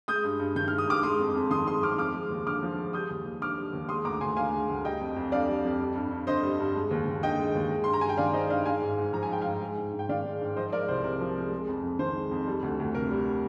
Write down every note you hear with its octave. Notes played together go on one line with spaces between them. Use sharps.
G#3 D#6 G6
G2
G2
D#3 G6
G#3 F6
D#6
G2 D6 F6
G#3 C6 D#6
F2
F2
D#3 C6 D#6
G#3 C6 D#6
F2 D6 F6
F3 D6 F6
G#3
D#2
D3 D6 F6
F3
G#3
G3 D#6 G6
D#2
D#2
D3 D6 F6
G3
D#2
G#3 C6 D#6
D2 A#5 D6
D2 G#5 C6
D3 F5 G#5
G#3
D2
G3 D#5 G5
F2
F2
D3 D5 F5
G3
F2
G3
G2
G2
D3 C5 D#5
G3
G2
G#3
D#2
D#2
D3 D#5 G5
G#3
D#2
G#3
G2 C6
A#5
G2 G#5
G5
D#3 D5 F5
G#3 C5 D#5
G2 D5 F5
G#3 F5 G#5
G#2
G#2
F3 A#5
G#5
G#3 G5
G#2 F5 G#5
G#3
G#2
G#2
G5
D#3 D5 F5
G#3
G#2
F3 C5 D#5
G#3 A#4 D5
C2 C5
C3 A#4
F3
G#3
G#3
F2
F2
D#3 C5
G#3
F2
G3
D2
D2
C3 A#4
G3